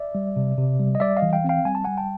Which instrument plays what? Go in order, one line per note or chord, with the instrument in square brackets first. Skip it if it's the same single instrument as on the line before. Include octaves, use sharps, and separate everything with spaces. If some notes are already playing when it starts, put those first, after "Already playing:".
Already playing: [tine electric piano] D5 E5
G3
C3
C3
G3
D#5
G3 D5 E5
D#5 F5
E3
F5 G5
C4 F5 G5
G3 G#5
A5
G3 F#5 G#5
G5 A5